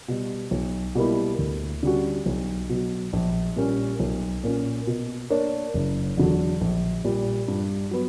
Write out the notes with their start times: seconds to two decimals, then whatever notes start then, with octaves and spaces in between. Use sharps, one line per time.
0.08 B2 G3
0.51 B1
0.95 B2 G3 A#3 E4
1.38 D2
1.83 D3 G3 C#4 F#4
2.26 B1
2.69 B2 F#3
3.13 A#1
3.56 A#2 G3 A#3 C#4
4.00 B1
4.44 A#2 A#3 C#4
4.87 B2
5.30 A#3 D4 A#4 C#5
5.74 F#1
6.17 E2 D3 F#3
6.61 A#1
7.04 A#2 G3
7.48 G2
7.91 F#3 B3